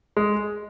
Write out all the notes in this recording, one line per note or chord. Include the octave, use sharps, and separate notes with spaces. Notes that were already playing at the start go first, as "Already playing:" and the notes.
G#3